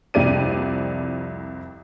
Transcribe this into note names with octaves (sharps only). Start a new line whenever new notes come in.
C2 F2 G4 D5 D#7